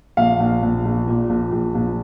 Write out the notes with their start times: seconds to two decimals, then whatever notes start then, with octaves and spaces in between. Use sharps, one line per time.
0.17 A#1 F5
0.40 A#1
0.62 A#1
0.85 A#1
1.07 A#2
1.30 A#1
1.52 A#1
1.75 A#1